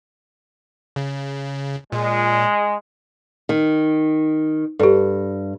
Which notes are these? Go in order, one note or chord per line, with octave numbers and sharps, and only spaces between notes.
C#3
A#2 G#3
D#3
G2 G4 A4